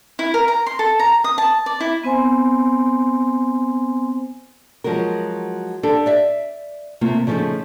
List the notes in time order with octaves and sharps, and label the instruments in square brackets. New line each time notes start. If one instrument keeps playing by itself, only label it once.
[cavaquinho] E4
A#4
A#5
C6
A4
A#5
D#6
A5
D5
E4
[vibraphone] B3 C4 C5 G#5 C6
[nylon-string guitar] F3 F#3 G#3 F#4 A#4
D4 G4 A4
D5 E5 F5
C3 A3 A#3 F4
C#3 F3 A3 C4 C#4 D#4